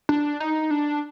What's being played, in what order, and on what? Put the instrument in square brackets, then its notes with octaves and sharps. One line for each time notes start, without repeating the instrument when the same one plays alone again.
[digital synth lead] D4
D#4
D4